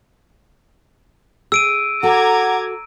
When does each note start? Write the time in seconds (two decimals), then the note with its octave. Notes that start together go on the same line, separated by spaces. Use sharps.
1.52 G#4 E6 D7 D#7
2.03 F#4 A4 F#5 A#5 D6 G#6